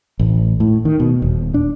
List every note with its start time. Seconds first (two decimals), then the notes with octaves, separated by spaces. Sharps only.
0.19 A1
0.60 A2
0.85 D#3
1.00 B2
1.22 D#1
1.54 D4